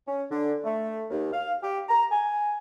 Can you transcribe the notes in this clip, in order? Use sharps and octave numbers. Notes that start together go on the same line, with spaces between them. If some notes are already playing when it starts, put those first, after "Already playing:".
C#4
D3
A3
D#2
F5
G4
A#5
G#5